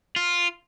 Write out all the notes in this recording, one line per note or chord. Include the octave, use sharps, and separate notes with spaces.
F4